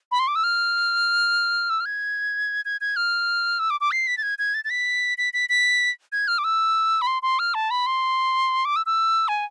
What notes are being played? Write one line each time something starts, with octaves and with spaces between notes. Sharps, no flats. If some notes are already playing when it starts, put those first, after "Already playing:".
B5
C6
D6
E6
F6
E6
F6
G#6
G#6
G#6
F6
E6
D6
D6
C7
B6
A6
G#6
G#6
A6
A6
B6
B6
B6
B6
G#6
F6
D6
E6
B5
C6
C6
F6
A5
B5
C6
D6
E6
E6
G#5